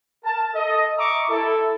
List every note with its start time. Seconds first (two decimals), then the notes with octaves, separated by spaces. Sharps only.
0.25 A#4 A5
0.54 A4 D#5
0.97 D#5 E5 A#5 C#6 D6
1.29 E4 A4